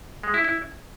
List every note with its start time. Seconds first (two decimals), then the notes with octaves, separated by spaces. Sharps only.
0.23 G#3
0.34 E4
0.44 E4